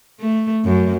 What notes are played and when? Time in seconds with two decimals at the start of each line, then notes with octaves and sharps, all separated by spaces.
0.20 A3
0.65 F#2